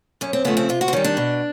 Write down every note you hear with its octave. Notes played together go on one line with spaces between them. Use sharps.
F#2 C#4
C4
C#3 F3 A3 B3
C4
C3 F4
F#4
C4
D#3 G3 C#4
D4
B2